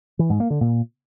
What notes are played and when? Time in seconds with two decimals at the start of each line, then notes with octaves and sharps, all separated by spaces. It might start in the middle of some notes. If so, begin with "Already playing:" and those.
0.19 E3
0.30 G#2
0.40 A#3
0.50 D3
0.61 A#2